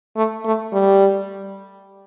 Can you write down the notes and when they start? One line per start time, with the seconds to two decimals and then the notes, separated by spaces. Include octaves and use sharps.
0.16 A3
0.45 A3
0.73 G3